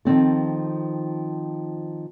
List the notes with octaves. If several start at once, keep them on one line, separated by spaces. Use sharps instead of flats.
D#3 F3 C4 A4